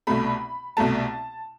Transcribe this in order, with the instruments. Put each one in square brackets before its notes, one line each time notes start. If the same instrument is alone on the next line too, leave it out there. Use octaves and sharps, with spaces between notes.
[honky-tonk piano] C2 B2 A3 B5
C2 B2 A3 A5